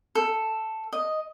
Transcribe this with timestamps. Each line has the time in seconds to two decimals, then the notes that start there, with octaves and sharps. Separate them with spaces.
0.15 A4
0.93 D#5